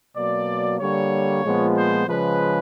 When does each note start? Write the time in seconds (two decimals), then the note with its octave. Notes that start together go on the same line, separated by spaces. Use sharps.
0.15 B2 F#3 A#3 D5
0.80 D3 G3 A#3 C#5
1.44 A#2 F3 G#3 B3
1.77 C5
2.08 C#3 F3 G#3 B4